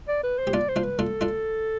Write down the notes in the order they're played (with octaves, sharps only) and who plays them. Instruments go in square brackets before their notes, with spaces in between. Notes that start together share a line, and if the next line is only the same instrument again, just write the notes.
[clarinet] D5
B4
C5
[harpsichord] G4
[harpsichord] D4 F4 [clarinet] D5
[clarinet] C5
[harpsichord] D4 F4
[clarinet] B4
[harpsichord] D4 F4 [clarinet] A4
[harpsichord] D4 F4